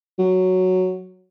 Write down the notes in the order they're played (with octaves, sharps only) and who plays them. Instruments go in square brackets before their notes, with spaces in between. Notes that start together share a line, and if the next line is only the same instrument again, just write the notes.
[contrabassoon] F#3